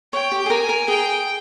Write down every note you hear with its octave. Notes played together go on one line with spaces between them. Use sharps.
C#5 G5
G4
G#4
A#4 G#5
A#4
G#4 G5